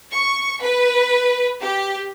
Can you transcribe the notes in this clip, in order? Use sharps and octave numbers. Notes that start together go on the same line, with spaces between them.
C#6
B4
G4